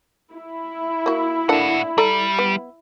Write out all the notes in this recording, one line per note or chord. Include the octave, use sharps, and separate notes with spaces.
E4
A#3 F#4
A2 A#3 D4 A4 F#5
G3 A4 D5 A#5
B3